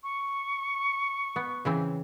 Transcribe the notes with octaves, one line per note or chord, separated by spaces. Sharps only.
C#6
B3
C#3 E3 C4